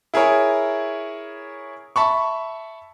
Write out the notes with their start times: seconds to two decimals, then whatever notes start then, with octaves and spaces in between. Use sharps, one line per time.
0.14 E4 G#4 A#4 C#5
1.96 E5 A5 B5 C#6